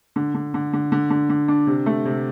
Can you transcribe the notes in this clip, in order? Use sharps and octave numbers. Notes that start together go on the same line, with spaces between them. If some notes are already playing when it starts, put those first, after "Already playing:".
D3
D3
D3
D3
D3
D3
D3
D4
C3
A3
C3